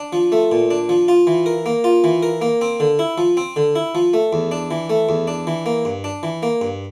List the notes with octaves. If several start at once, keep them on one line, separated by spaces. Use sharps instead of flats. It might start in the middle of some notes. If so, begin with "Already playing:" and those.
Already playing: D4
F3
A3
A#2
D4
F3
F4
E3
A#4
A#3
F4
E3
A#4
A#3
C4
D3
E4
F3
C4
D3
E4
F3
A3
E2
D4
E3
A3
E2
D4
E3
A#3
G2
D4
E3
A#3
G2